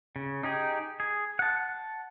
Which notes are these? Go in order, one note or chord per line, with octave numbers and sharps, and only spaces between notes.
C#3
D#4 G4 G#4
G#4
F#5 A5